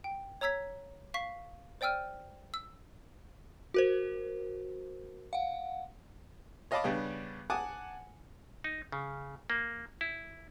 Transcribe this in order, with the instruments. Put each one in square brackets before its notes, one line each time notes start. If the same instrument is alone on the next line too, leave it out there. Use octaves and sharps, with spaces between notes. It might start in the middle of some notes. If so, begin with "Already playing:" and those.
[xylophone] G5
C#5 A#5 E6 G#6 B6
F5 C#6 B6
C5 D5 G5 E6 F6 D#7
E6
[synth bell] F#4 A#4 C5
F5 F#5
[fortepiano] C#5 D#5 F5 A5 B5 D6
C#3 G3 B3 D4
F#5 G#5 A5 D6 D#6 F#6
[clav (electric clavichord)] D#4
C#3
A#3
E4